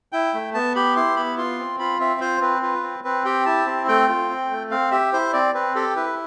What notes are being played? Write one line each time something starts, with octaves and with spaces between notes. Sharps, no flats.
E4 G5
A3
B3 A5
G4 B5
E4 C6
B3 B5
F4 C6
C4
F4 B5
C4 E5
F4 C5
C4 B4
F4 B4
C4
C4 B4
G4 G5
E4 A5
C4
A3 G5
F4
C4
A3
C4 F5
G4 E5
E4 C5
C4 D5
C4 B4
G4 A4
E4 B4